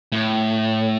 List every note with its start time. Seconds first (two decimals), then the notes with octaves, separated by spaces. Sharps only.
0.12 A2